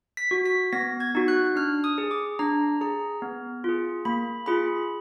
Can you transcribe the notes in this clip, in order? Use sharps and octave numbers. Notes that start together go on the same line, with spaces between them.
B6
F#4
B6
B3 A#6
G#6
D#4 F#4
F#6
D4 F6
D#6
G#4
D6
D4 A#5
G#4 A#5
B3
F4 G#4
A#3 B5
F4 G#4 B5